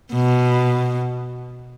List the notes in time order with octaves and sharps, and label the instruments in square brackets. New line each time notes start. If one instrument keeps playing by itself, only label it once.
[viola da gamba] B2